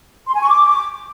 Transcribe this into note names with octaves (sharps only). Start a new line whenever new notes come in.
C6
G#5
C#6
D6